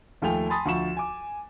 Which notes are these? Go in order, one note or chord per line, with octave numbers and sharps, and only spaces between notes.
D#2 F3 A3 G5 G#5 F7
G#5 A5 B5 C6 D#6 A6
D2 F3 C#6 E7
G#5 D6